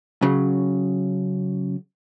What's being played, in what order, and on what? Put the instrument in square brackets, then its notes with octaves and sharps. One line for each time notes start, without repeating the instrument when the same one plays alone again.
[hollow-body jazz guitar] C#3 F#3